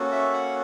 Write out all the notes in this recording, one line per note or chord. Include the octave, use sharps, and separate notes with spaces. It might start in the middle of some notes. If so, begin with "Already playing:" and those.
Already playing: A#3 C#4 F#4 A4
E5
F#5